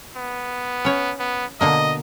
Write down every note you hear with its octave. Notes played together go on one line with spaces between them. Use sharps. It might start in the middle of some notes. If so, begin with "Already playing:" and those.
B3
C#4 C#5
B3
B2 D3 A#3 D#5